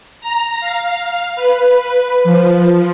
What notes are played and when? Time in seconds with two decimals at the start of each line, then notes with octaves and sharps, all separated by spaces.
0.21 A#5
0.60 F5
1.36 B4
2.24 F3